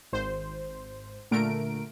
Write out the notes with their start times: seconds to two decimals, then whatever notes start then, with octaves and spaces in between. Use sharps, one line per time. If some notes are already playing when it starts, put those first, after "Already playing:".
0.13 G#1 C5
1.31 A#2 D3 A3 A#4 D7